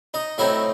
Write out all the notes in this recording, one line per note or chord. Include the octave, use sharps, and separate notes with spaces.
D#4 D#5
A2 F#3 C4 D#4 E4 E5